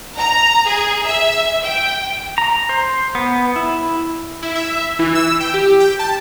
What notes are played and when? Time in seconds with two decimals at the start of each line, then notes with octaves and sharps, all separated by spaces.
0.17 A#5
0.66 G#4
1.05 E5
1.64 G5
2.38 A#5
2.69 C5
3.15 B3
3.56 E4
4.43 E4
4.55 E5
4.99 E3
5.15 E6
5.40 G5
5.54 G4
5.80 G5
5.99 A5